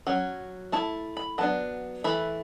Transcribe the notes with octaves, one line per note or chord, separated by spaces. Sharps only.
F#3 C#4
A3 E4 A5
B5
F#3 B3 D4 A5
E3 A3 E4 B5